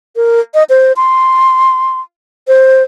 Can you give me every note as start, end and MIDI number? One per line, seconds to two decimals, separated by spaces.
0.16 0.40 70
0.54 0.64 75
0.69 0.93 72
0.96 2.00 84
2.48 2.83 72